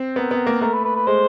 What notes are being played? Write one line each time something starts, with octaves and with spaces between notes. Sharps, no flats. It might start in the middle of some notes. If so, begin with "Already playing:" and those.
Already playing: C4
B3 A#4
B3
A#3
A3 A#4
B4
B4
B4
G#3 C5